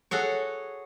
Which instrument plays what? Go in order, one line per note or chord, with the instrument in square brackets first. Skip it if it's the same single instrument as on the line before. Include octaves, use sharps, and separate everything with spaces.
[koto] F#4 G#4 A4 C#5